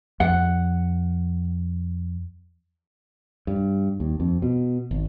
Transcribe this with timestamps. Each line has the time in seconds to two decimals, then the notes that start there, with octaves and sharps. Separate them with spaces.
0.20 F2 F#5
3.47 G2
4.00 D#2
4.20 F2
4.42 B2
4.91 G#1